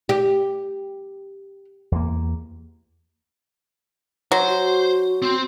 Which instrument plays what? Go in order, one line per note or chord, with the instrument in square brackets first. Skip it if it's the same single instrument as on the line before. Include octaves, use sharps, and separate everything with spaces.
[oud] G4
[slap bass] E2 A#3
[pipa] F#3 [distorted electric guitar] C5
[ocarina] F#4
[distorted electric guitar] C4 C5